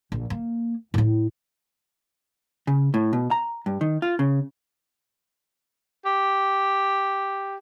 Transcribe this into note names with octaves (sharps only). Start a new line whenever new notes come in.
A#1
A#3
A2 E4
C#3
A2
B2
A#5
G2
D#3
F4
C#3
G4